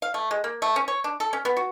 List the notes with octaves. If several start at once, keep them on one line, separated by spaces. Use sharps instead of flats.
F5
A3
G#3
A#3
A3
C#4
C#5
D4
A4
C#4
B3
F#4